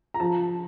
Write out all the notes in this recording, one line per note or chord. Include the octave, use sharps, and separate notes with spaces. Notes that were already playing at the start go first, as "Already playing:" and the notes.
A#5
F3 A5